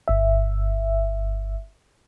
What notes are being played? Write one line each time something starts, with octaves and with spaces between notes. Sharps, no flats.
G1 E5